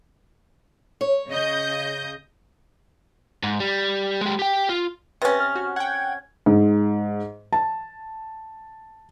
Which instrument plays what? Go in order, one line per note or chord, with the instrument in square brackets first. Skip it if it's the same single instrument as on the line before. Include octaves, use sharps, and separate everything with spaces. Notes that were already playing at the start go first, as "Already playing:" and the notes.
[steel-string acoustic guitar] C#5
[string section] C#3 D#5 G6
[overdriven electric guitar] G#2
G3
G#3 G4
G4 G5
F4
[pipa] C3 C#4 [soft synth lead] B4 [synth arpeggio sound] A6 A#6
[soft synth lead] F6
[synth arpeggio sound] F#4
[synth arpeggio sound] F#5 G5 [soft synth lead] G#6
[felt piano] G#2
A5